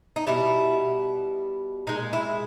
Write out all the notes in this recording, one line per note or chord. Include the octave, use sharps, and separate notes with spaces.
D#4
B2 G3 E4
A#2 G#3 D#4
E4